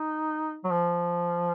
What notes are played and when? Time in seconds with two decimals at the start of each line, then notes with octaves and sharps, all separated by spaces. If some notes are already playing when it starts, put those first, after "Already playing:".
Already playing: D#4
0.64 F#3
0.70 F3